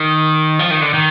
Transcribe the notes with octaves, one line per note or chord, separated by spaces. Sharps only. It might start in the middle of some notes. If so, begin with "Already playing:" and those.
Already playing: D#3
F3
D#3
D3
D#3